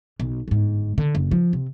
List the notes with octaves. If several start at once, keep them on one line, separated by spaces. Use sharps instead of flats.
B1
G1 G#2
D3
F#1
F3
C3